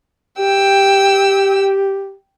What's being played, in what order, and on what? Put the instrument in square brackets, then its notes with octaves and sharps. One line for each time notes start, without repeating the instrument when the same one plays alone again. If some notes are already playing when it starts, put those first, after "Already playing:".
[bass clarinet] G4 [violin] G5 E6